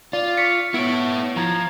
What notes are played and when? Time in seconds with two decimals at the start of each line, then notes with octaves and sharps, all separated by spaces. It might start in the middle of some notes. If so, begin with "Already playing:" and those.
0.13 F4 D5
0.38 C#6 B6 C#7
0.74 B3 E4 C#5 D7
1.37 F3 A#5 G#6